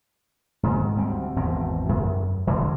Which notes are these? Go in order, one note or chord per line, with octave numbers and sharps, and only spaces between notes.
G#2 D#3
D2 G3 C4
G#1 E2 B2 C4
F#2
E1 D3